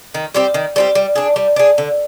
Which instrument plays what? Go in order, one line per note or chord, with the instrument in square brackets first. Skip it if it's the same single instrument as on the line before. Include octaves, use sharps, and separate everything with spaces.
[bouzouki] D#3
G3 C4 G4
D#3
G3 C4 G4
G3
D4 G#4
G3
D4 G#4
D3